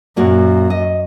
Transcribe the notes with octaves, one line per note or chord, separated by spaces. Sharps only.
F#2 A#2 A#3 F#4
D#5